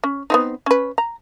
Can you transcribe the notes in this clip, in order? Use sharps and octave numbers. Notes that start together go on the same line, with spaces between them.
C#4
B3 C4 D#4
C#4 B4
A#5